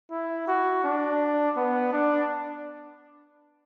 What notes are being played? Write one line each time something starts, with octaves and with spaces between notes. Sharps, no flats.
E4
F#4
D4
B3
D4